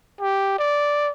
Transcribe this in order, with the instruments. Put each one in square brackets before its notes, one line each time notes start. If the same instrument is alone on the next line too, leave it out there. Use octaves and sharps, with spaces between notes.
[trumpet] G4
D5